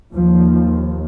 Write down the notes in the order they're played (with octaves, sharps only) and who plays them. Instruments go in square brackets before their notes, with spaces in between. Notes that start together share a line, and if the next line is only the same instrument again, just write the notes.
[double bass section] D#2 F3